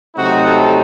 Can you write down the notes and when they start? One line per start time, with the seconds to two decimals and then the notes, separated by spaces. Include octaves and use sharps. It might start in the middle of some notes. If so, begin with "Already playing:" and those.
0.15 C3 F#3 A3 C4 D#4 F#4
0.44 A4